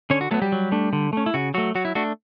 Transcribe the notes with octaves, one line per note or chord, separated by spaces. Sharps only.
D3 C#4 C#5
F#4
F#3 A3 B3 A4
G3 G4
F#3
A3 D4
D3
A3 C#4
E4
C#3 F#4
F#3 A3 F#4
F#3 F#4
E4
A3 D4 F#4